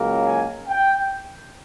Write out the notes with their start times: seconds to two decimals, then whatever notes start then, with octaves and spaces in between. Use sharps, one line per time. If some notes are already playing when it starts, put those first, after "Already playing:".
Already playing: C#2 C#3 F#3 A#3
0.27 G#5
0.68 G5